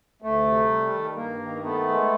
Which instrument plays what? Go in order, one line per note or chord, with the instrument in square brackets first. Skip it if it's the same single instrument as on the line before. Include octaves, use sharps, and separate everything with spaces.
[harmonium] D2 [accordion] A3
[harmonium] C3
G3
D#3
[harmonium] G2 [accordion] A#3
[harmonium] D#3
[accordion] A3 [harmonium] B3
[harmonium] G#3